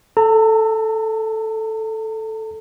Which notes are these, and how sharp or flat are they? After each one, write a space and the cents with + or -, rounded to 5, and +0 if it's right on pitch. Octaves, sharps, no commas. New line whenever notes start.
A4 +0 A#5 -45